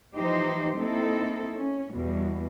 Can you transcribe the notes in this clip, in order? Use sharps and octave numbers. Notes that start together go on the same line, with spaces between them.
E3 F3 D#4 G4 C5
A#3 C4 D#4 E4 A4
C#4
E2 B2 G3